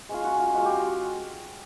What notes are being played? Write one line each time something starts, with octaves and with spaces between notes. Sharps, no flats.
G#3 C#4 F4
F#4
F4
G#3 C#4 F4 F#4
G4
F#4